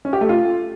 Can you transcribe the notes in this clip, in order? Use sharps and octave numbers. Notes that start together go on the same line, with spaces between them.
C#4
G4
A3
F4